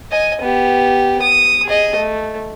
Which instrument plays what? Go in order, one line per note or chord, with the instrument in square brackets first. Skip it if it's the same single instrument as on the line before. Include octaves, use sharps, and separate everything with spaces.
[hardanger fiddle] D#5 G#5
B3 G4
D#6
G#4 D#5
A3